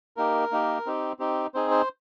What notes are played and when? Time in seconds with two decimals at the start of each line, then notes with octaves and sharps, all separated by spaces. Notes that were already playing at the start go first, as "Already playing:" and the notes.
0.17 A#3 D#4 G4 A#4
0.51 A#3 D#4 G4
0.86 C4 D#4 G4
1.19 C4 D#4 G4
1.54 C4 D#4 G#4 C5
1.71 C5